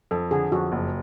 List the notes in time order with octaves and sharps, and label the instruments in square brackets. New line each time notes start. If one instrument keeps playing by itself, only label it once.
[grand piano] F2 [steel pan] A4
[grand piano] D3 [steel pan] G#4
[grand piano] F2 [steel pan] F#4
[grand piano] F#1